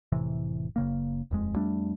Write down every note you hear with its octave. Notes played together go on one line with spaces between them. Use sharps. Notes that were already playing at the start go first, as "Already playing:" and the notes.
F1 A2 C3 E3
F#1 C#3 A#3
D#1 F2 G#3
F2 G3 A3 D4